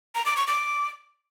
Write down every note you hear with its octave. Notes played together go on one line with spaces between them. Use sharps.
A#5
D6
C#6
D6